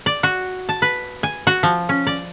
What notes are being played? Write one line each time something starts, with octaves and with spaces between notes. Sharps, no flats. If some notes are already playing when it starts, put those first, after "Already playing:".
D5
F#4
A5
B4
G#5
F#4
F3
C#4
D5